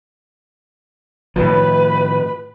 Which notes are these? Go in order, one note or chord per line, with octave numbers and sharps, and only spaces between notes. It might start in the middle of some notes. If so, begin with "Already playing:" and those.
A2 D#3 F3 B4